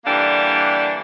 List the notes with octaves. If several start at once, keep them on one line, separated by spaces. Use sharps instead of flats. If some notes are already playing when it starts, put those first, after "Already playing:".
D3 E3 G3 A#3 D4